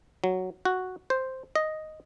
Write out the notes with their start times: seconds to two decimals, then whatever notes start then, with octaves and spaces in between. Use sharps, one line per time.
0.24 F#3
0.65 F#4
1.10 C5
1.55 D#5